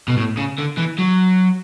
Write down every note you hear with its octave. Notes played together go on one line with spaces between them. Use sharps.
B2
A2
C#3
D3
E3
F#3